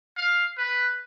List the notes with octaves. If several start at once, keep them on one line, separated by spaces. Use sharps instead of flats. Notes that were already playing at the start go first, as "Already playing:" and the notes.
F5
B4